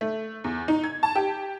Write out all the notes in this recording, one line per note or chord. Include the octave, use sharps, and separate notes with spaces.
A3
E2
D#4
G#6
A5
G4